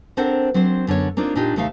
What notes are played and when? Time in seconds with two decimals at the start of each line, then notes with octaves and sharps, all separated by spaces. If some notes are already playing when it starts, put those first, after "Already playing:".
0.17 C4 D4 A4 A#4 C5 F#5
0.54 F#3 C4 D4 C5
0.87 F#2 D3 B3 C#5
1.17 A#3 C4 D4 D#4 F4
1.36 A#2 D4 D#4 F4 G4
1.56 D#2 C3 A3 D#4 E5 F5